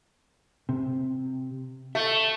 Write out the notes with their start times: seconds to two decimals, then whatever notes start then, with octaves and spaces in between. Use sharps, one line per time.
0.69 C3
1.95 A3 E5